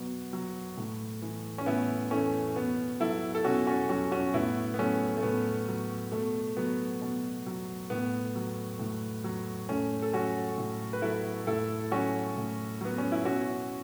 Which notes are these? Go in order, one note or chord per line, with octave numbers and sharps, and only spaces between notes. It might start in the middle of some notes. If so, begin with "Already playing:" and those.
Already playing: B2 F#3 B3
F#3
A2
E3
C#4
A2 B3 E4
E3 A3 C#4
B2 B3
F#3 E4 A4
A4
B2 C#4 F#4
C#4 F#4
F#3 C#4 F#4
C#4 F#4
A2 B3 E4
B3
F#3 A3 C#4
A3
A2 B3
F#3
B2 A3
F#3 B3
B2
F#3
A2 B3
F#3
A2
F#3
A2 A3 C#4
A4
F#3 C#4 F#4
A2
B4
F#3 E4 A4
A2 E4 A4
F#3 C#4 F#4
A2
F#3 B3
C#4
E4
B2 C#4 F#4